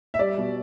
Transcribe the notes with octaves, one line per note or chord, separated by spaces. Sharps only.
E5
G3 D5
B2